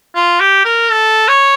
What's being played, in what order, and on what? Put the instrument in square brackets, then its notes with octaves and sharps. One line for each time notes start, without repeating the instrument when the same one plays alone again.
[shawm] F4
G4
A#4
A4
C#5